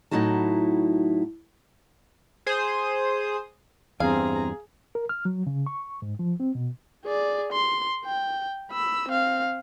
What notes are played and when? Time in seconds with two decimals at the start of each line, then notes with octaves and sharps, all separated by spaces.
0.11 A2 F#3 D#4 E4 F#4 A5
2.46 G#4 C5 D#6
4.00 E2 G2 C4 G#4 F5 A#5
4.95 A#4
5.09 F6
5.25 F#3
5.47 C#3
5.66 C#6
6.02 G#2
6.19 F3
6.40 C4
6.55 B2
7.05 G#4 D5
7.53 C6
8.06 G5
8.72 B5 E6
9.09 C4 F5